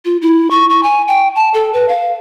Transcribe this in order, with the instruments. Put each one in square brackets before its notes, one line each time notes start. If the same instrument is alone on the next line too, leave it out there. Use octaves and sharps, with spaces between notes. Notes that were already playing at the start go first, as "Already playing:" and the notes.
[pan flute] F4
E4
C#6
C#6
G#5
G5
A5
A4
B4
F5